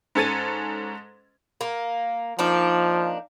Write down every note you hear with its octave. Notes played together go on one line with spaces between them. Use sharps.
G#2 C#4 A4 G#6 A6 D#7
A#3
F3 A#3 D4 D#4